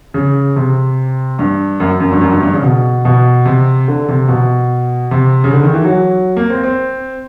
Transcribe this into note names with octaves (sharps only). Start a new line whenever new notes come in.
C#3
C3
G2
F#2
F#2
G2
F#2
G2
G2
C#3
B2
B2
C3
D3
C3
B2
C3
C#3
D3
D#3
E3
F#3
A#3
C4
C4